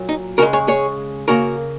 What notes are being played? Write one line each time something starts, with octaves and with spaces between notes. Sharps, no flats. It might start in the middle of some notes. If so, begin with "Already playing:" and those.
Already playing: A#2 F#3
D#4
C#3 G#3 F#4 A#4
G#4 C#5
G#4 C#5
C#3 A#3 F#4 A#4